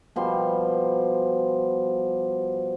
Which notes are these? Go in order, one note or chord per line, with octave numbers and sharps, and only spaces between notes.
B2 F3 G3 C6